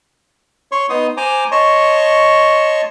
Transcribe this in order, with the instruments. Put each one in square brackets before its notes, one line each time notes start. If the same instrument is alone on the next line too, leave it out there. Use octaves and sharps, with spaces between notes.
[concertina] C#5 C6 C#6
B3 D#4 C6 D#6
C5 G#5 A#5 C6 D6
C#5 D#5 A5 C6 C#6